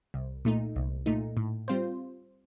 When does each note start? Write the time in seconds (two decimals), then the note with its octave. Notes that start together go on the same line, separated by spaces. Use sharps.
0.14 C2
0.45 A#2 A3 D#4
0.76 C2
1.06 A#2 A3 D#4
1.37 A2
1.68 G3 C4 F4 C5